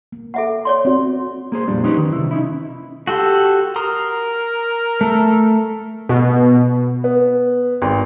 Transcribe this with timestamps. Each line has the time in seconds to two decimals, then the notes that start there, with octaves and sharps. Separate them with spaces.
0.12 A#3
0.34 A4 E5 F#5
0.65 C#5 D5 C6
0.85 C4 F#4
1.52 A#3 G#4 C5
1.68 F2 A#2 G3 D4
1.84 C#4 D#4 G4 B4 C5
1.97 D#3
2.13 C3 E4
2.31 C#4 D#4 E4
3.07 F#4 G4 A4 C6
3.76 A#4 A#5 C6 D#6
5.01 A3 A4
6.09 B2
7.04 B3
7.82 G#1